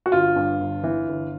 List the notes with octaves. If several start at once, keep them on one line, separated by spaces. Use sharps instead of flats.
F#4
G1 F4
G2
G1
E3
G1